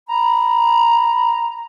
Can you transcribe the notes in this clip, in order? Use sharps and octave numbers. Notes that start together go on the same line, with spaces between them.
A#5 B5